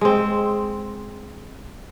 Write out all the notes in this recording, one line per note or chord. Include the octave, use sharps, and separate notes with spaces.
G#3 C4